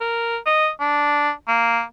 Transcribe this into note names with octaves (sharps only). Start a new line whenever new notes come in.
A#4
D#5
D4
A#3